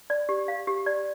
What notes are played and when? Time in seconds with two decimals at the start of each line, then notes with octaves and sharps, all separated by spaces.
0.10 D5
0.29 G4
0.48 F5
0.67 G4
0.86 D5